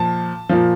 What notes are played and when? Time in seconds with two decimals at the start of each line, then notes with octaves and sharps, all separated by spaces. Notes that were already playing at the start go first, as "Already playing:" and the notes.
Already playing: A#2 F3 A5
0.49 A#2 F3